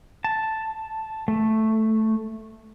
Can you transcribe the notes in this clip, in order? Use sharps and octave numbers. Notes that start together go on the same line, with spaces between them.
A5
A3